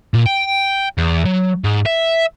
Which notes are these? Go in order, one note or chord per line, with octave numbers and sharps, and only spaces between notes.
A#2
G5
E2
F#3
G#2
E5